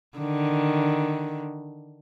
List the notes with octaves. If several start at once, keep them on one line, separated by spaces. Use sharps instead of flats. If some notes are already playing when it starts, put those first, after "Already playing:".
D3 D#3